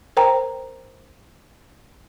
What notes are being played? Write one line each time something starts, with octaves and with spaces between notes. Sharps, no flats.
A#4 C5 G5 A#5